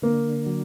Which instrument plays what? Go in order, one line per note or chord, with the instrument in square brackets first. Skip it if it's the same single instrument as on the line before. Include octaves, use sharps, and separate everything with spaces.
[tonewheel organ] D3 [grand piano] A#3
[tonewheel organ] F#3